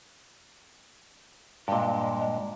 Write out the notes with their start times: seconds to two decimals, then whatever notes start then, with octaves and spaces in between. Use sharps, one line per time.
1.68 G2 A#2 G#3